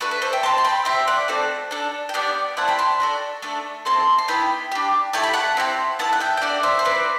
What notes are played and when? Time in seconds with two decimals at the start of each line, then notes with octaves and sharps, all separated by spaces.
0.01 A3 D4 F#4 B4
0.11 B4
0.22 A4 C5
0.33 E5 G5
0.43 C4 G4 A5 C6
0.58 C6
0.65 G5 B5
0.85 C4 G4 E5 G5
1.07 D5 F#5
1.28 A3 C4 F#4 A4
1.71 D4 A4
2.09 G5
2.14 B3 D4 G4 D5 F#5
2.57 A3 C4 E4 F#5 A5
2.68 G5 B5
2.79 A5 C6
3.00 D4 F#4 A4
3.42 A3 D4 A4
3.85 C4 E4 A4 A5 C6
4.18 C6
4.28 B3 E4 G4 G5 B5
4.72 D4 G4
5.13 A3 E4 G4 A5
5.23 B5
5.33 F#5 A5
5.57 C4 E4 G4
5.99 B3 E4 A4 F#5 A5
6.13 F#5
6.20 E5 G5
6.37 G5
6.42 D4 F#4 A4 D5 F#5
6.63 C5 E5
6.79 C5
6.85 C4 E4 A4 B4 D5